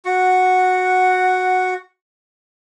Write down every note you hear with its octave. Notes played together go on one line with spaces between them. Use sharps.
F#4 F#5